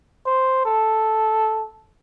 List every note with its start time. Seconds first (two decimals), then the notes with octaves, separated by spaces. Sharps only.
0.26 C5
0.65 A4